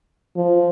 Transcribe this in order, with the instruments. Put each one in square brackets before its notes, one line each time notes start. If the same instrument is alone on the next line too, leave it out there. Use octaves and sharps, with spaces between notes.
[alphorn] F3